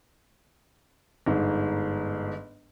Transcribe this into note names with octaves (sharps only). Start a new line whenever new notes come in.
G1 G#2